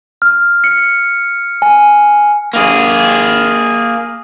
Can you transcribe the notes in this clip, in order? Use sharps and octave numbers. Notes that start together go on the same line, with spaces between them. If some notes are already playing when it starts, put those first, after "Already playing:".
F6
C#7
G#5
A#3 G#4